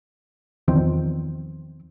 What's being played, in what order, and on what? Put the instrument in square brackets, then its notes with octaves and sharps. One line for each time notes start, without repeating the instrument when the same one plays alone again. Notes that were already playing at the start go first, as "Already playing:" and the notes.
[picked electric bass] E2 D#3 F3 C4